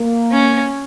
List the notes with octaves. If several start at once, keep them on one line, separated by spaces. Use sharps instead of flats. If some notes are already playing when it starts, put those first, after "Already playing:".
Already playing: A#3
C#4